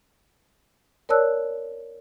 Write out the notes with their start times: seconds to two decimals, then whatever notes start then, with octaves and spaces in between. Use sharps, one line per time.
1.09 A#4 C#5 D5 A5 E6 F#6